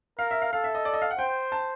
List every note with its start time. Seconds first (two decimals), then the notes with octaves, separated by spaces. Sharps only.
0.19 A#4 F5
0.31 E5
0.42 F5
0.53 A4 F5
0.64 E5
0.75 D#5
0.85 D5
0.93 D#5
1.02 F5
1.11 F#5
1.19 C5 G5
1.52 A5